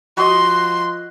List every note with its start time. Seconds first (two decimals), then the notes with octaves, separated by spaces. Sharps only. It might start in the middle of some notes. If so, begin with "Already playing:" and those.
0.17 F3 F#4 D#5 C6